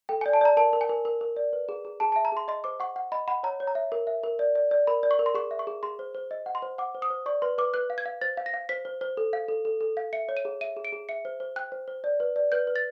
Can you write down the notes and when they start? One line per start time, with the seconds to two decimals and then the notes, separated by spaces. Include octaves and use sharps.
0.09 A4 G5
0.21 D5 G#5
0.33 A5
0.41 D5 A#5
0.57 A#4 A5
0.73 A#4
0.81 G#5
0.89 A#4
1.05 A#4
1.21 A#4
1.37 D5
1.53 B4
1.69 G#4
1.85 G#4
2.00 G#4 A5
2.12 E5 A5
2.25 A#5
2.32 G#4 C6
2.48 D#5 C6
2.64 C5 D6
2.80 F#5 C#6
2.96 F#5
3.12 D#5 B5
3.28 F#5 B5
3.43 C#5 A#5
3.60 C#5
3.67 A#5
3.75 E5
3.92 A#4
4.07 E5
4.23 A#4
4.39 D5
4.56 D5
4.71 D5
4.87 A#4 B5
5.03 D5
5.11 C#6
5.19 A#4
5.26 C6
5.35 G#4 C#6
5.51 E5
5.59 C#6
5.67 G#4
5.83 G#4 C6
5.99 C5
6.15 C5
6.31 D#5
6.46 F#5
6.55 C6
6.62 C5
6.78 F#5 D6
6.95 C5
7.02 D#6
7.10 C5
7.26 D5 C#6
7.42 B4 C6
7.58 B4 D6
7.74 B4 F#6
7.90 F5
7.98 G#6
8.06 F5
8.21 C5 A6
8.37 F5
8.46 A#6
8.54 F5
8.69 C5 B6
8.85 C5
9.01 C5
9.17 A4
9.33 F5
9.49 A4
9.65 A4
9.81 A4
9.97 F5
10.13 E5 C#7
10.29 C#5
10.37 D#7
10.45 G#4
10.61 E5 D#7
10.77 G#4
10.85 D7
10.92 G#4
11.09 E5 C#7
11.25 C5
11.40 C5
11.56 G5 F#6
11.72 C5
11.88 C5
12.04 D5
12.20 B4
12.36 D5
12.52 B4 G6
12.67 B4
12.76 A6